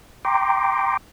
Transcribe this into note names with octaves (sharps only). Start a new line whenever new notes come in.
G5 A#5 C6 D6